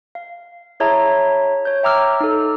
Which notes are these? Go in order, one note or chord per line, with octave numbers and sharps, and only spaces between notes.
F5
E4 G#4 C#5 E5 A5 A#5
C#5 G6
E5 G5 A#5 D6 E6 F6
D#4 A4